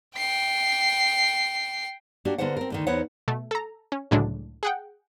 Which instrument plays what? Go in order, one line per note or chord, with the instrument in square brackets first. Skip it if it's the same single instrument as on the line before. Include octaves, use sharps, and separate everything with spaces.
[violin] G5 C7
[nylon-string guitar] A#3 D4 F#4 G4
D3 A#3 B3 D4 C5 F#5
C4 A#4
D2 D3 D#3
E2 B3 D#4 C5 C#5 F#5
[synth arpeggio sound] B2 A3
A4 A#5
C#4
C#2 A2 D3 F#3 G#3 D4
G#4 F#5 G5